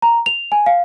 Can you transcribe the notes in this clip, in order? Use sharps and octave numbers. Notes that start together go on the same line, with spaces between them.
A#5
F7
G#5
F5